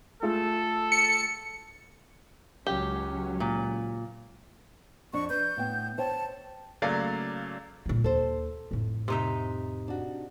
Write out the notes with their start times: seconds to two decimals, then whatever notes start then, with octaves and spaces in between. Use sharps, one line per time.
0.22 A3 F4 G#4 A4
0.92 C#7
2.67 C#2 F#3 C#4 G4
3.40 A#2
5.13 F2 D4 C#6
5.30 B4 G6
5.57 A2 B3 G5
5.98 C5 C#5 G5 A5
6.82 C#3 F#3 A3 A#3 D5 F5
7.86 A#2 G3
8.04 D#2 A4 C5
8.71 F2 A2
9.08 C3 D#4 E5
9.88 D4 F#4